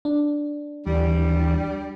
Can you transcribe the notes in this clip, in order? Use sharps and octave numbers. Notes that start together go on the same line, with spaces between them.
D4
D#2 E3 G3